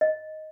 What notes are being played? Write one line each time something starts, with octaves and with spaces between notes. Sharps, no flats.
D#5